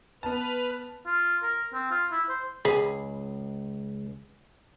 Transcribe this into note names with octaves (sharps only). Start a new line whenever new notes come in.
B3 B4 A5 F6
F4
A#4
C4
F4
E4
C5
C#2 G#4 B5